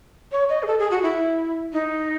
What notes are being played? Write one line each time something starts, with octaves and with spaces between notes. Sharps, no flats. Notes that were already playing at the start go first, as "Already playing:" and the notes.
C#5
D#5
G#4
A4
G#4
F#4
E4
D#4